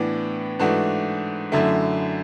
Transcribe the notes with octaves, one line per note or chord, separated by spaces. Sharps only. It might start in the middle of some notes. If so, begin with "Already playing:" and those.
Already playing: A2 E3 B3 D4
G#2 E3 A3 D4 F#4
F#2 D3 A3 E4